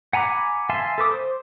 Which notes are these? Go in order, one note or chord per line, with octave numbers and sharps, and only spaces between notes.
F#5 G#5 A#5 B5 D6
E5 F5 G#5 A5 C6
A4 B4 D6 D#6
C5